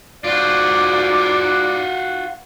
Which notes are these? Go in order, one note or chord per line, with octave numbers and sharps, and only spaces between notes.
G#2 F4 F#4 D5